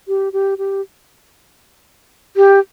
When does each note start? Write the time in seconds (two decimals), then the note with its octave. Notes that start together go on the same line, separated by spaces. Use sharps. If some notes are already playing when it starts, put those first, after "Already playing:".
0.08 G4
0.33 G4
0.58 G4
2.37 G4